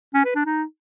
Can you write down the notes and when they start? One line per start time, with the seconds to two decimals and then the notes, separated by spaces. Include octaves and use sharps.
0.14 C#4
0.25 B4
0.35 D4
0.46 D#4